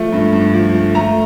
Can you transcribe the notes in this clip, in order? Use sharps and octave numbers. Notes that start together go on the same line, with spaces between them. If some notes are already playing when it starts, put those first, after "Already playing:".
Already playing: F3 A3
G2
G2
F3
A3
A3 A#5